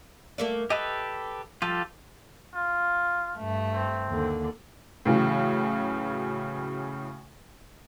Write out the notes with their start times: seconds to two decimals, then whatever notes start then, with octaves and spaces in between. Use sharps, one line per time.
0.38 A3 A#3 D5
0.70 G4 A4 B4 D#5
1.62 F3 F4 G4 A4
2.54 F4
3.37 G2 A3
3.74 C4
4.08 D#2 D3
5.05 A2 C#3 E3 F#3